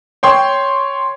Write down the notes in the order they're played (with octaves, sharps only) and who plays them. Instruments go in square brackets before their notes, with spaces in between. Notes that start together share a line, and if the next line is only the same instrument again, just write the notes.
[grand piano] C#5 G5 C6